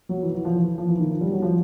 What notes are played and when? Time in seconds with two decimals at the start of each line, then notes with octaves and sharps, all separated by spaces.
0.09 F#3
0.23 E3
0.34 E3
0.45 F3
0.56 E3
0.78 F3
0.89 E3
0.99 D#3
1.10 F3
1.21 G3
1.32 F#3
1.42 F3